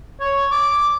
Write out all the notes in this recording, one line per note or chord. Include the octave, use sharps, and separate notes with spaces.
C#5
D6